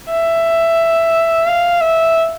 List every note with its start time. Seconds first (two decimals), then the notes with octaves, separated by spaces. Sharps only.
0.10 E5
1.47 F5
1.81 E5